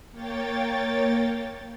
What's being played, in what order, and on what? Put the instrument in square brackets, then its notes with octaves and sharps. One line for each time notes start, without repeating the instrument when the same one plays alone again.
[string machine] A#3 C#5 G5 A6